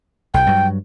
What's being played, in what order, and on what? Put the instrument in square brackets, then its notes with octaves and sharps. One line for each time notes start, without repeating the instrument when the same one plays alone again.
[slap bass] B1 [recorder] G5
[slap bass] G2 F#3